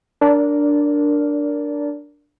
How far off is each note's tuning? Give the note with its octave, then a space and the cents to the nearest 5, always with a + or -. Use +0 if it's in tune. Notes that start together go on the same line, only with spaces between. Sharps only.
D4 +0 A#4 +0 D5 -25